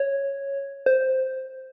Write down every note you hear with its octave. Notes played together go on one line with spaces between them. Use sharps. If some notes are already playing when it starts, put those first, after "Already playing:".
Already playing: C#5
C5